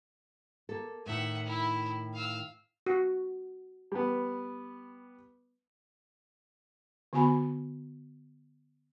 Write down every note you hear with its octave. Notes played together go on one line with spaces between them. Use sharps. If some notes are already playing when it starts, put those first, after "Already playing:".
A#3 A4
A2 D#3 E5 F#5
E4
F5 E6
F#4
G3 B3
D3 B3 F#4 G#5 B5